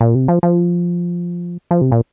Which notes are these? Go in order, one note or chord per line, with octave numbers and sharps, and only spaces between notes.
A#2
C3
F3
F3
F3
C3
A#2